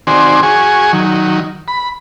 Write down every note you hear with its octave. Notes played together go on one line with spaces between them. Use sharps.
D#3 C4 F#4 C5 D5 G#5
F#4 G#4 G#5 C#6
D#3 F#3
B5